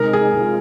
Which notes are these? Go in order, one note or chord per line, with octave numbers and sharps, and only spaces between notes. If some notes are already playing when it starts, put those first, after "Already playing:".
Already playing: C3 G#3 D#4 A#4
G#4
C3 G#3 F4